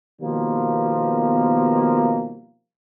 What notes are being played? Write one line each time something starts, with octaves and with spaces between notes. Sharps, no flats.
B2 D#3 F3 G3 A#3 B3